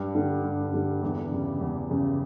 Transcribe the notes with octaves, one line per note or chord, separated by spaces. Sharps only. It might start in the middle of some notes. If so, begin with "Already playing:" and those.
Already playing: G2
D3 G3
G2
D3 G3
E2
C#3 G3
E2
C#3 G3